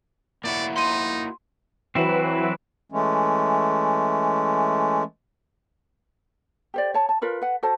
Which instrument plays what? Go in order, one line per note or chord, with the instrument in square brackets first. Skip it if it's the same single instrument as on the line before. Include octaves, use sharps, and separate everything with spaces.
[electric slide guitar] A#3 E4 F#4 [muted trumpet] D5
[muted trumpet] D#4 [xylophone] C6 D#7
[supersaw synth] E3 F#3 B4 [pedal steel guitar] C4 E4 F#4
[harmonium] E3 G#3 A3 C#4
[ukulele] G4 C5 D5
C#5 A5
A5
F4 A#4 B4 C#5
B4 F#5
F#4 A4 C5 A5